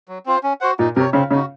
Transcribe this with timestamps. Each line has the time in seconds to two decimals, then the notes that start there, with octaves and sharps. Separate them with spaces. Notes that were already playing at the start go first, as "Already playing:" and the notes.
0.08 F#3
0.26 C4 F4 C5
0.43 C#4
0.61 F#4 C5 F#5
0.79 A#2 D#4
0.96 C3 A#4
1.00 C#5
1.13 C#3 C4
1.31 C#3 D#4 F#4